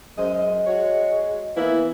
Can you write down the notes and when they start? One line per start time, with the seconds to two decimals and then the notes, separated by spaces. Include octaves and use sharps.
0.18 F#2 G#3 C5 D#5
0.66 F#4 C#5
1.57 E3 A#3 B3 E4